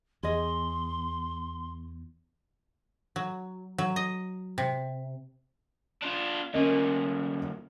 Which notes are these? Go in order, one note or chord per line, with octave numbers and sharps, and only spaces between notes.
E2 G#4 D#5 C6
F#3
F#3
D#5
C3
D4 F4
D2 A#2 C#4 A#4 D#5